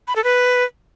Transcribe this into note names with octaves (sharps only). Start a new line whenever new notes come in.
B5
A4
B4